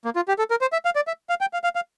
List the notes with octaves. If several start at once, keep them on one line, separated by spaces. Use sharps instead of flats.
A#3
F4
G4
A4
A#4
C5
E5
F5
D5
E5
F5
G5
F5
F5
F5